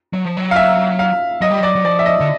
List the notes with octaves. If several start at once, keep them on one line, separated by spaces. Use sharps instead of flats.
F#3
F3
F#3
F5
E5
F5
F#3 D#5
G3
F#3 D5
F#3
F3 D5
E5
D#5
D3